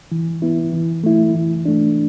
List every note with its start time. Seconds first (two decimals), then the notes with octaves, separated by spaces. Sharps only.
0.12 E3
0.42 B3 E4
0.73 E3
1.04 A3 E4
1.34 E3
1.65 A3 D4